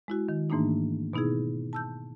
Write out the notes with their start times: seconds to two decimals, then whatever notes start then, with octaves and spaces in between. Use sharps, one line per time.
0.08 G#3 E4 F#4
0.29 D#3
0.50 G#2 E3 A3 A#3 D4 D#4
1.13 B2 B3 D#4 E4 G#4
1.73 A5 E6 G6